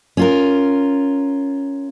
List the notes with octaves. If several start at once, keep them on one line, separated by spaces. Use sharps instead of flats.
C#4 F4 A#4